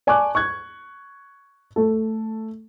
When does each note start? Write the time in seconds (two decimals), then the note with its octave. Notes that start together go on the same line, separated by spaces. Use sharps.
0.07 D5 G#5 A5 C#6 D6 F#6
0.35 C#6 F#6 G#6
1.76 A3 A4